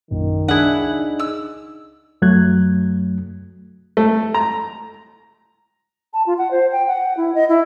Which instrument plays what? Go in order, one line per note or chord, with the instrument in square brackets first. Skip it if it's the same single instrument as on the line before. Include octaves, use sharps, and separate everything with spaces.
[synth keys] A#1 F#2 A#2 [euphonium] D#3
[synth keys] C#2 [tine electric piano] D4 G#4 [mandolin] E4 F#5
[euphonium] D#4
[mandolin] E6
[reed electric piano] F#2 F#3 A3 F#6 G#6
[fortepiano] A3
A#5
[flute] A5
F4
F#5
C5
G5
F#5
E4
D#5
E4